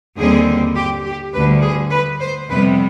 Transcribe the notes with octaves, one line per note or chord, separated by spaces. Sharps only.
D#2 D3 G3 C4 G#4
G4
G4
D2 D3 G3 B4
G#4
B4
C5
F2 C3 G3 B3 B4